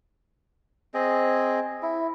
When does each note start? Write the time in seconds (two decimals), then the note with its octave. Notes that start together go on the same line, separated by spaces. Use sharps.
0.94 C4 G#4 D#5
1.82 E4